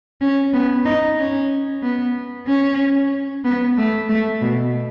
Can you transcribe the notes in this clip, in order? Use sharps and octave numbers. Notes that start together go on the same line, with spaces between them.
C#4
B3
D#4
C#4
B3
C#4
B3
A3
A3
B2